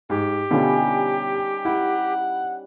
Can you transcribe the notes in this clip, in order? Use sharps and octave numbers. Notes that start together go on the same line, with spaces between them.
G#2 G4
B2 D3 G3 C#4 D#4 F4
E4 F#5